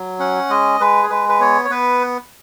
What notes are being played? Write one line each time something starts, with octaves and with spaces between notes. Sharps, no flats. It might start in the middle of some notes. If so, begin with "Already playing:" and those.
Already playing: F#3
C#4 F#5
G#3 D#5
G#3 B4
G#4
G#3 B4
B4
B3 C#5
C#5
B3 B4